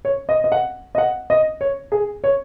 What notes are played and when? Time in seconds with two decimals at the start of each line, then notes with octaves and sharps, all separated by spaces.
0.05 C#5
0.29 D#5
0.44 D#5
0.52 F#5
0.95 D#5
0.98 F#5
1.30 D#5
1.61 C#5
1.92 G#4
2.24 C#5